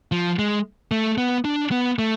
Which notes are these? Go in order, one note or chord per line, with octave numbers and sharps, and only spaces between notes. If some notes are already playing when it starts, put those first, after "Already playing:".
F3
G#3
A3
B3
D4
B3
A3